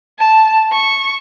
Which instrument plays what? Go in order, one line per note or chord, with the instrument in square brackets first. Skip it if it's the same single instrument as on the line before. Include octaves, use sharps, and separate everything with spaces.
[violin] A5
C#6